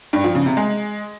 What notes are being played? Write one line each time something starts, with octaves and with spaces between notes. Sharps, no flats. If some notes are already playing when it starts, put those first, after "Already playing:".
G2
F3
C#3
C3
G#3